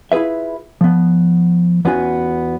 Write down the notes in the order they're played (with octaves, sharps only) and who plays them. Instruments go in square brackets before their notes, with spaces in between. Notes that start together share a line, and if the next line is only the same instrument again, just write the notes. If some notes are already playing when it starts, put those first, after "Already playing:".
[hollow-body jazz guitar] E4 F4 G#4 B4 E5
F3 B3
E2 B3 C#4 F4 F#4 G#5